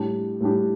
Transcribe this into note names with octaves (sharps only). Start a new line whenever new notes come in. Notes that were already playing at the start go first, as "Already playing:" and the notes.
Already playing: A2 G3 D4 G4
A2 G3 D4 G4